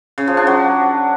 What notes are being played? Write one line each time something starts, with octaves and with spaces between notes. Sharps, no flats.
C#3
F3
D4
F#3